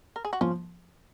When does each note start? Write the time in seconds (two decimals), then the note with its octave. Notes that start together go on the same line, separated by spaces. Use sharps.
0.16 A#4
0.25 G#4
0.33 F#4
0.41 F3 C#4 F4